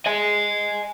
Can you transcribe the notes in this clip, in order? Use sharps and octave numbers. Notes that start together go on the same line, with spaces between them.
D#5 G#5